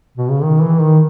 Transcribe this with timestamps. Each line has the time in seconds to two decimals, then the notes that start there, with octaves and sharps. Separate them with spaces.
0.17 B2
0.30 C#3
0.43 D#3
0.63 E3
0.81 D#3